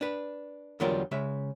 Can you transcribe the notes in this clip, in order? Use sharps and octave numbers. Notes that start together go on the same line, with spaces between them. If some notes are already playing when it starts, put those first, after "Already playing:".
D4 B4
E2 D3 F#3 G3 F4 A#4
C#3 G#3 E5